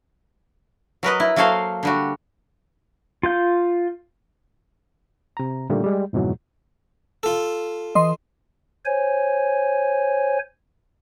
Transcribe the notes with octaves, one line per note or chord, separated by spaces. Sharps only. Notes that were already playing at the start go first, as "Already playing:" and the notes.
F#3 A#4 B4 D#5
E4
F#3 A#3 F#4 A4 C5 F5
D3 G3 F#4
F4 F5 G6
C3 A#5
A#2 D3 D#3 G3 A3 A#3
G3 G#3
F2 G#2 B2 E3 F#3
F4 A4
E3 D#5 C6
C5 C#5 G#5